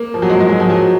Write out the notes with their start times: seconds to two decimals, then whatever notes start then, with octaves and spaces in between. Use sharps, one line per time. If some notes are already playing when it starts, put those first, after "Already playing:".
Already playing: A#3
0.14 F3
0.22 F#3
0.30 G#3
0.40 G#3
0.49 F#3
0.60 F3
0.70 F#3